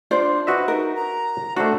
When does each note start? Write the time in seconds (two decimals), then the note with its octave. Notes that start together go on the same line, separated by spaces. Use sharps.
0.11 D4 F4 C5 D5
0.47 F#4 B4 D#5 E5
0.68 D#4 A#4
0.96 A#5
1.56 A3 D4 F#4 C5